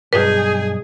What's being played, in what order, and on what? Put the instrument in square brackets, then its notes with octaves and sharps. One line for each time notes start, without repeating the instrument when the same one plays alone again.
[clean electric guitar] B1 G2 D#4 [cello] G#4 [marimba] B4